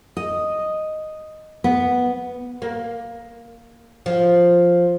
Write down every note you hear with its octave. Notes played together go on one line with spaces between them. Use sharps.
D#5
B3
A#3
F3